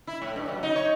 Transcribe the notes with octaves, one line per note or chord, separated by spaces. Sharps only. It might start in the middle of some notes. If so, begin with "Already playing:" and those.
E4
A2
G2
F#3
D#4
C#5